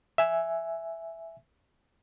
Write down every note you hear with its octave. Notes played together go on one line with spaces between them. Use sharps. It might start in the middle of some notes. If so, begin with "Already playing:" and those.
E5 G#5